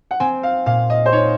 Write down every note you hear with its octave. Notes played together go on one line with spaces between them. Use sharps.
F#5
C4 G#5
F5
A#2 F5
D#5
C5
D#4 C#5